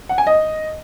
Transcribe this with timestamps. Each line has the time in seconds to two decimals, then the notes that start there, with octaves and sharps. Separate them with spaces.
0.09 F#5
0.18 G#5
0.27 D#5